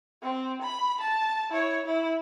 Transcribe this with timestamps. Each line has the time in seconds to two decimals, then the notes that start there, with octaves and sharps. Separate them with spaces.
0.23 C4
0.62 B5
1.01 A5
1.50 E4 C#5
1.86 E4